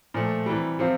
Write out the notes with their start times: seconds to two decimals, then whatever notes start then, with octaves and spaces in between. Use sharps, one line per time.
0.14 A#2 F3 A3
0.46 C3 E3 G3
0.79 C3 F3 C4 F4